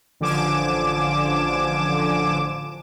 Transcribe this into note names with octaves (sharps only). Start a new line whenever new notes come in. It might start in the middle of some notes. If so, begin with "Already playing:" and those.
A1 D3 F3 G#5 D6 E7